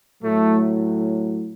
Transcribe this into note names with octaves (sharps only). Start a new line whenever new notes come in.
A2 F#3 A3